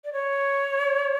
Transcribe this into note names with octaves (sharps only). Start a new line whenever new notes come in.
D5
C#5